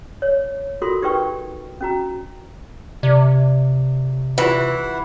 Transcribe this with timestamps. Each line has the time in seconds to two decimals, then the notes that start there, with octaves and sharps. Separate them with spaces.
0.22 C#5
0.82 F4 F#4 A4 A#4 C6
1.02 D#4 G4 A#4 B4 G5 C#6
1.81 C#4 F#4 A#5
3.03 C3 D5
4.38 E3 E4 F4 G4 E5 F#5